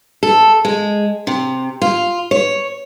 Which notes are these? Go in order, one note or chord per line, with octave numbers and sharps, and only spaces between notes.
A4
G#3
C3
F4
C#5